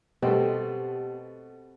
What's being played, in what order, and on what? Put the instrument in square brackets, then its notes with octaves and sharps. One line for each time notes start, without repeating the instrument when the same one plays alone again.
[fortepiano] B2 A3 [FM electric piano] B3 G4 [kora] C4